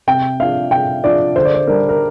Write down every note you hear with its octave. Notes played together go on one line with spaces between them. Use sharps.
C3 G5
F3 D4 F5
C3 G5
F3 D4 D5
D3 C5
D5
C5
G3 D4 A#4
A#4